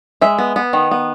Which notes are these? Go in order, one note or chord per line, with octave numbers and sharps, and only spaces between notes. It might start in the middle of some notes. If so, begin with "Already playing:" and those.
G#3 E5
B3
B3
D#3
B3